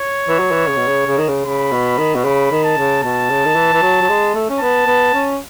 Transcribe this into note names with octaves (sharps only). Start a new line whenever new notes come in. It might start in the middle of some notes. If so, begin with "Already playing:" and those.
Already playing: C#5
E3
F#3
E3
C#3
B2
C#3
C#3
D#3
C#3
C#3 B5
B2
D#3
B2
C#3 B5
D#3
A5
C#3
B2 A5
C#3
D#3
E3
E3
F#3
F#3
G#3
A3
C#4
B3 A5
B3
C#4